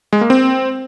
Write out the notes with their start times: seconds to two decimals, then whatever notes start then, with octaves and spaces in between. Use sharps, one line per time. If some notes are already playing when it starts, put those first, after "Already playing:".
0.13 G#3
0.21 A#3
0.30 C4